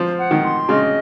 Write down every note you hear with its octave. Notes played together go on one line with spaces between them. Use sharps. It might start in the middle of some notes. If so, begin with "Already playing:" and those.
Already playing: F3 C5
F#5
D#3
C6
C#3 D#5